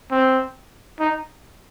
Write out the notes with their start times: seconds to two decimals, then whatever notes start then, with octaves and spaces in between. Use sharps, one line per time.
0.11 C4
1.00 D#4